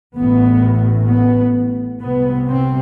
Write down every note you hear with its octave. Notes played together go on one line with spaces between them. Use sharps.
A1 A2 B3
B3
C2 C3 B3
C4